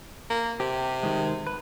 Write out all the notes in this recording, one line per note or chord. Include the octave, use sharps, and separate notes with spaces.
A#3
C3 G4
D#3 G#3
B4